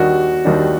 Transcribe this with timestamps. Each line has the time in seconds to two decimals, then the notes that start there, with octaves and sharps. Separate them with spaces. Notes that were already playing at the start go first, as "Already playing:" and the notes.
Already playing: D#2 D#3 G3 D4 F#4
0.45 D#2 D#3 G3 D4